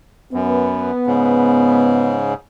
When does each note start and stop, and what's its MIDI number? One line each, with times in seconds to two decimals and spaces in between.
0.33 0.91 42
0.33 2.22 59
1.07 2.34 44
1.07 2.34 49